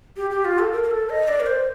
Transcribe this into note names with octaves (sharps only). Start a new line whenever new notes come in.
G4
G4
F4
A4
A#4
A#4
A4
D#5
D5
A#4
C5